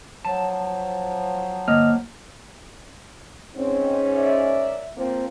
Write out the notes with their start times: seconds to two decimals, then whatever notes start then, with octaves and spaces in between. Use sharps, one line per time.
0.25 F3 F#3 A5
1.68 G1 A#3 D#5 F6
3.55 G#2 C4 C#4
4.14 A#4 D5 E5
4.97 F3 A#3 C4